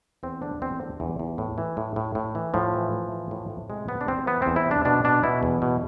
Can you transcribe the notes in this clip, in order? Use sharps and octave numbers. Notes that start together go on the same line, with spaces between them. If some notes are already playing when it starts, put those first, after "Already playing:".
E2 C4
D3 D4
E2 C4
D3
E2
E2
A2
E3
A2
A2
A2
E3
A2 F3
E3
A2
E3
A2
A2
C3 G#3
C3 B3
D4
E2 C4
E3 B3
E2 C4
E4
C3
D4
B2 D4
B2 D4
B2 E4
E2
B2